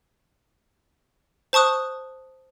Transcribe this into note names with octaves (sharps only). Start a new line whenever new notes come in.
C5 A5 C#6 D#6 F#6